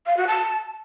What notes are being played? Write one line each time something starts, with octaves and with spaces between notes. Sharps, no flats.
F5
F#4
A5